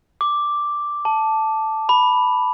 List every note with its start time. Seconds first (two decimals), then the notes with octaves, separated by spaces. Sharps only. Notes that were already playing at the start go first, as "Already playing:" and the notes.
0.21 D6
1.05 A5
1.89 B5